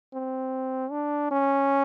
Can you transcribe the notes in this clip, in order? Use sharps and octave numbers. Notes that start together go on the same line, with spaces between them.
C4
D4
C#4